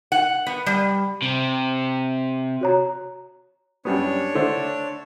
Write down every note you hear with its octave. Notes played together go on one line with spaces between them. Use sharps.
F#5
B3
G3
C3
F#4 C#5 A#5
F#2 G3 B3 D4 C#5
D3 A3 C5